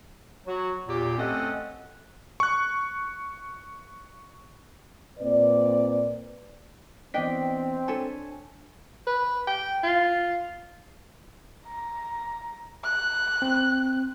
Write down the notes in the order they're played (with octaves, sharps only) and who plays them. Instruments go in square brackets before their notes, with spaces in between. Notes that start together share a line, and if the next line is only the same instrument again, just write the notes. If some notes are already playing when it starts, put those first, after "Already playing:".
[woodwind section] F#3 F#4
E2 A#2 G4
A3 C4 C#4 A4 D#5 F#5
[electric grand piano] C#6 F#6
[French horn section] A#2 C4 B4 D5
[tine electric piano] E3 B3 B6 [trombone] C4 [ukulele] D4 D#5 G5
[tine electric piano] D4 G#5 [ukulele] A4 C#5
[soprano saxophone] B4
G5
F4
[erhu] A#5
F#6
[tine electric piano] C4